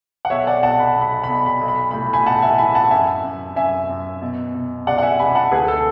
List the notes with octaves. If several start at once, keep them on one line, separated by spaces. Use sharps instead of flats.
F#5
B1 C#5 E5
D5 F#5
B1 F#5 A5
B5
B1
B5
B1 B5
B5
B1
B5
A2 B5
G#5 B5
B1 F#5 A5
E5 G#5
E3 G#5 B5
F#5 A5
F#2 E5 G#5
F#2
F#2 E5 G#5
F#2
B2
B2
C#2 D5 F#5
F#5
E5 G#5
C#2 G#5 B5
F#5 A5
D2 G#4 B4
A4